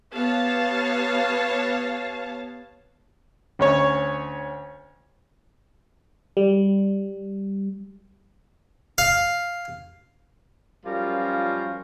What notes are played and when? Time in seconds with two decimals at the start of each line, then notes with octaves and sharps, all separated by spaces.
0.14 B3 G4 C#5 F5 A5
3.59 D2 C#4 C#5
6.37 G3
8.98 F5
10.86 F#2 F3 G3 C#4 F4 A#4